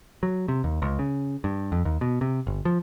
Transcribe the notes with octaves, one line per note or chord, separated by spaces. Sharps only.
F#3
C3
D#2
C#2
C#3
G2
F2
D#2
B2
C3
G1
F3